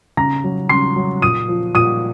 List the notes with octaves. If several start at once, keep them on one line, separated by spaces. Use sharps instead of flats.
C#3 A#5 A#6
F#3
C#3 C6 C7
F#3
A#2 D#6 D#7
F3
A#2 D#6 D#7